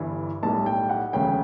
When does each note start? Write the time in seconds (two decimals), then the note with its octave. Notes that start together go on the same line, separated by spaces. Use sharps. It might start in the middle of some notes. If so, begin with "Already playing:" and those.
Already playing: G1 G2 E3
0.43 B1 A2 G3 A5
0.66 G5
0.89 F#5
1.13 E1 D2 C#3 F#3 G5